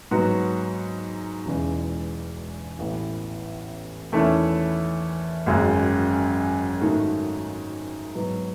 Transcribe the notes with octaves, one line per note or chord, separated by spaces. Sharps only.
G#2 F#3 B3 F#4
E1 E2 C#3 E3 G#3
A1 A2 E3 B3
E2 D#3 A3 C#4 E4
G#1 F#2 C#3 G#3
G#2 D#3 A3 D#4 F#4
G#2 F#3 B3